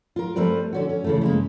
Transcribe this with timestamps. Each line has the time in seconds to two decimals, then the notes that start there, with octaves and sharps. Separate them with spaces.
0.16 F4 A#4
0.36 G3 A3 C4 A#4 B4
0.73 D3 C#4 F#4
0.89 C#4
1.04 C#3 E3 A3
1.21 C#3 G#3 A#3